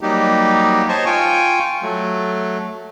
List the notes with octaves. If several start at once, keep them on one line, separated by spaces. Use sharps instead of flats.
F#3 G3 A#3 D#4 G4
C5 C#5 D#5 A5 C#6
F4 G5 G#5 C#6
F#3 A3